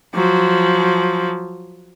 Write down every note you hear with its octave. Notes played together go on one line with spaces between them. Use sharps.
F3 F#3